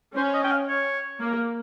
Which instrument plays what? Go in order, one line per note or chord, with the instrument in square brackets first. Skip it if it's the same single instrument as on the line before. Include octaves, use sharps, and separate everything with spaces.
[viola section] C#4 [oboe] C5
[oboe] D#5
G5
F5
C#5
[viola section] A#3